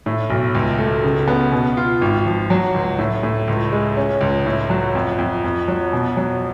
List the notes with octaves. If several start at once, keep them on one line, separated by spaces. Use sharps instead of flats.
A2
B1
C#2
A3
C#3
B3
B2
F4
G#1
F3
F#3
C#2
A2
A2
C#2
G#3
C#4
C#2
A2
F#3
F2
F2
F2
F#3
B2
F#3